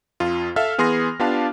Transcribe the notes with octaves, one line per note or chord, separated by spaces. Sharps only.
F2 F4
A4 E5 F5 F6
E3 B3 G#4 C6 F6 A#6
B3 D4 F4 G4 F5 A5